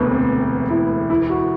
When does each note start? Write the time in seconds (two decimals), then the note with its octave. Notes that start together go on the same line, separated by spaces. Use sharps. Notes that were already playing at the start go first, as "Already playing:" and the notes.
Already playing: E1 D2 C3 E3 A3 B3
0.11 C4
0.70 E4
1.10 E4
1.30 F#4